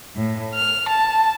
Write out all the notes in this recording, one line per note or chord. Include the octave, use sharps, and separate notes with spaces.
A2
F6
A5